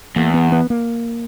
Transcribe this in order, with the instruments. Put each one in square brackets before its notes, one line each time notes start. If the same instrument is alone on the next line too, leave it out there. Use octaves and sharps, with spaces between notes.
[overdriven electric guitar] E2 [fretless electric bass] A#3
[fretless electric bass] B3
B3
A#3